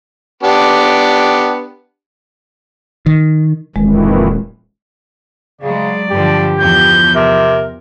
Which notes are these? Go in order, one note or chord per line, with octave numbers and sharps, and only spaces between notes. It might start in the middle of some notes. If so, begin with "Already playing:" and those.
B3 D4 G4
D#3
D#1 F2 D#3 E3 G#3
C#3 F#3 G#3 D5
G2 D3 F3 G4
E2 F3 G6
C3 A#4